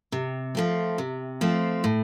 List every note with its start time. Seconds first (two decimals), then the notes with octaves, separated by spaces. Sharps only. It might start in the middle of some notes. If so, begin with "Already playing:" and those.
0.12 C3
0.55 F3 A3 C4
0.98 C3
1.41 F3 A3 C4
1.84 A2